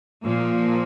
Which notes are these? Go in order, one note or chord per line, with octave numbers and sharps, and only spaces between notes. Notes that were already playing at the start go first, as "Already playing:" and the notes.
A#2 F3 A#3